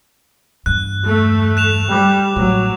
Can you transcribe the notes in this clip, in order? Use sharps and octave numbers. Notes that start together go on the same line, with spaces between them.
E2 G2 F#6
A3
F#6 E7 F7
G3 D6
A1 A2 F#3